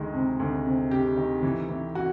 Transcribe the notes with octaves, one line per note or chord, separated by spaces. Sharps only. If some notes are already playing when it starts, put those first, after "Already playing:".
Already playing: D2 D#3 G#3
C3
D2
C3
C3 G4
D#3
E3
E3
F#4